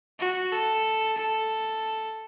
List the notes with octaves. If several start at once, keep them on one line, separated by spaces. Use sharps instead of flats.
F#4
A4
A4